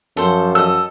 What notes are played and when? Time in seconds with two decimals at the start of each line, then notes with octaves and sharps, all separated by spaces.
0.17 F#2 F3 A4 C5
0.55 A4 D#5 E6